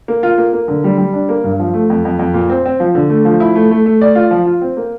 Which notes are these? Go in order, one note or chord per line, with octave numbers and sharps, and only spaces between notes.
A#3
F4
A#3
A#3
D3
G3
G3
D4
A#3
G2
F3
A3
F2
F2
F2
A#2
C4
C4
F3
D3
A3
F3
E4
A3
A3
A3
D5
F4
F3
F4
C4
A#3